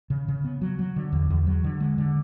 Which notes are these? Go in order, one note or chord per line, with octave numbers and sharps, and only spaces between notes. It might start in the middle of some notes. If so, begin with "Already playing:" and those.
C#3
C#3
B3
F#3
F#3
D3
E2
E2
F#3
D3
G#3
D3